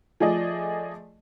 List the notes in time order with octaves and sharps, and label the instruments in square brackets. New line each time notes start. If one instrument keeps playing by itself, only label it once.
[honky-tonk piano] F3 A3 G#4 D5 D#5